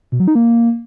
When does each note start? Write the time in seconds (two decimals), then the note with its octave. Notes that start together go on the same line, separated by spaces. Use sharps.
0.12 B2
0.20 F#3
0.28 D#4
0.35 A#3